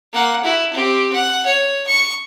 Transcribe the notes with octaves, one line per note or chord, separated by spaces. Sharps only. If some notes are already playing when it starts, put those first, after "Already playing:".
A#3 F#5
E4 F#4
C4 G4
F#5
C#5
C#6